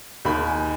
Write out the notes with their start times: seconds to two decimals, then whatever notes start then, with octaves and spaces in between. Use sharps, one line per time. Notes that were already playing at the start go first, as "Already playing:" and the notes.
0.25 D#2 D#3 B5
0.47 G#5